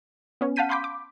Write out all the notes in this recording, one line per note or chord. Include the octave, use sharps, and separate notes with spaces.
B3 C#4
F5 F#5 A5 G6 B6 D#7
F5 B5 C6 D6 G6 B6
D6